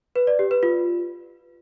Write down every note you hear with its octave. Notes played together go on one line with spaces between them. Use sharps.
B4
D5
G4
B4
F4